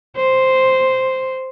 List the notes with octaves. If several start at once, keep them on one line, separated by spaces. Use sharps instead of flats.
C5